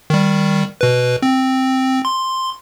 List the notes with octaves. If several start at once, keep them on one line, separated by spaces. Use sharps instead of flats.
D#3 G3
B2 B4
C4
C6